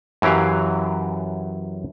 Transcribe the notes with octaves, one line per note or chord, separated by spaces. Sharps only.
F#2 E3 F#3 G4 F5